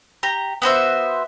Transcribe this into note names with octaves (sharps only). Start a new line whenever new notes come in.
G4 A#5
B3 F#4 C5 E5